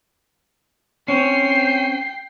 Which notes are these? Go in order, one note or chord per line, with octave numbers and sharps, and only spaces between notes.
C4 C#4 G5 C7